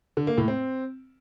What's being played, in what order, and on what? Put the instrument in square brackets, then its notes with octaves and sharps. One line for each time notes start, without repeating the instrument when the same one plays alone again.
[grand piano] D3
A#3
A2
C4